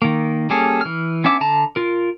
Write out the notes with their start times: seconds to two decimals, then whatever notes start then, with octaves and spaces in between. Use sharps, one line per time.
0.02 D#3 A#3
0.50 G3 A#3 C#4 G#4 A4
0.81 E3 F6
1.24 B3 C#4 D4 E5 D6
1.41 D3 A5 A#5
1.76 F4 A#4